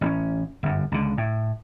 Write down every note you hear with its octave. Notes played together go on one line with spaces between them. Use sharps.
A1 C4 C#4
G1 F#2
C#2 D3
A2